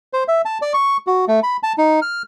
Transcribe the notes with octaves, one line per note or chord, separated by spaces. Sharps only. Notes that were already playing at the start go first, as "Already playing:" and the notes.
C5
E5
A5
D5
C#6
F#4
A3
B5
A5
D#4
F6